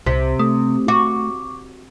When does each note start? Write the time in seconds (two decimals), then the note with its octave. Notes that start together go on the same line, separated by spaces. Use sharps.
0.06 C2 C3 C5 B6
0.39 A3 D#6
0.88 F#4 C#6 D6